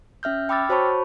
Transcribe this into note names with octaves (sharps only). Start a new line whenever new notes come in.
C#4 E5 F6 G6
G5 B5 D6 E6 F6 A6
F#4 C5 C#5 A5 B5 C#6